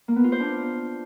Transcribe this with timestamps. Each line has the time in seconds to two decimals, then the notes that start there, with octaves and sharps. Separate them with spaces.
0.08 A#3
0.16 B3
0.24 F4
0.32 C5
0.40 D4